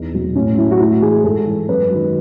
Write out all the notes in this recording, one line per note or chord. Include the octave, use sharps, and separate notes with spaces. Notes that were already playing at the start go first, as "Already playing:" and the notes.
Already playing: E2 D#4
B2 F#3
A2 C#4
F#3 E4
F#4
A2 E4
E3 G#4
G#2 A4
E3
F#2 B4
D#3 F#3